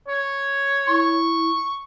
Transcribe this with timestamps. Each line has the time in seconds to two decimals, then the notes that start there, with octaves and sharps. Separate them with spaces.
0.08 C#5
0.88 E4 C#6